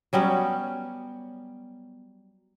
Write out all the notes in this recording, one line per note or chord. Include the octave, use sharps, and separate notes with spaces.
F#3 G3 B3 C#4